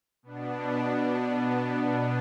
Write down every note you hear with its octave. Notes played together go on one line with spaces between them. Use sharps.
B2 B3 D4